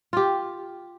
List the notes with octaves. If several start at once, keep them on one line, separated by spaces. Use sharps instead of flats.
F4 G4